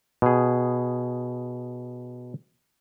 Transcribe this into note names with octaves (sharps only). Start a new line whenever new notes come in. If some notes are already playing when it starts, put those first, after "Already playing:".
B2 G#4